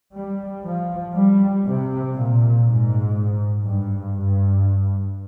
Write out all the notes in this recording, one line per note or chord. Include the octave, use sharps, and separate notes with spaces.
G3
F3
G3
C3
A#2
G#2
G2
G2